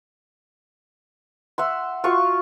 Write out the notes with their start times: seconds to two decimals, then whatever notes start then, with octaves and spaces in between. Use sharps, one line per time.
1.58 E5 F#5 C6
2.04 F4 F#4 F5 C#6